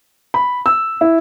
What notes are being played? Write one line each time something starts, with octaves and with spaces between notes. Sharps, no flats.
B5
E6
E4